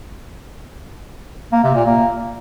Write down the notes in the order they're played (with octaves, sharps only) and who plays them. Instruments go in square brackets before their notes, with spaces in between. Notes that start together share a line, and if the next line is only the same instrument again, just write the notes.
[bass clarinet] A#3
C3
A#2
A#3